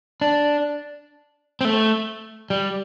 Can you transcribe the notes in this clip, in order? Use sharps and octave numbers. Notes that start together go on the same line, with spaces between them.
D4
C4
A3
G3